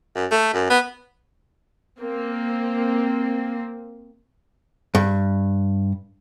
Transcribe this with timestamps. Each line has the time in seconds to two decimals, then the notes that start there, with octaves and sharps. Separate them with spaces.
0.15 F#2
0.31 A3
0.54 F#2
0.70 B3
1.99 A#3 C4
4.95 G2